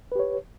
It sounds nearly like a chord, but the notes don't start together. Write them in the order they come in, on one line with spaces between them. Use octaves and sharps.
B4 G4 C#5